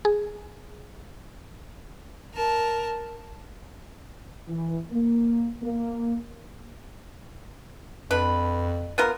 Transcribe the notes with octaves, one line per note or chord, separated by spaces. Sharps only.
G#4
A#4 A5
E3
A#3
A#3
F2 D4 B4
B3 F4 A#4